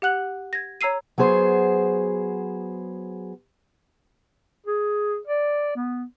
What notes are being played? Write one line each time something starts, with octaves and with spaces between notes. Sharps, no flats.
G4 F#5 F#6 F#7
G#6 A#6
C#5 A#5 E6 C7 D#7
F#3 B3 G#4 C5
G#4
D5
B3